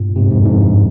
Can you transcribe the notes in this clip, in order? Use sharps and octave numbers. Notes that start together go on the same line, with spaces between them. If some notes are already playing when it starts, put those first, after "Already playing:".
Already playing: G2 A#2
G#2 C3
F2 G#2
F2 G#2
G2